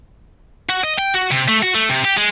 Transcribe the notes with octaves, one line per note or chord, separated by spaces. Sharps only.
F#4
D#5
G5
F#4
C3
A3
F#4
A3
C3
G4
G#3